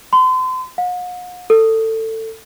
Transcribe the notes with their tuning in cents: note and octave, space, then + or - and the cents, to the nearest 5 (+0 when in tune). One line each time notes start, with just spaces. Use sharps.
C6 -40
F#5 -45
A4 +20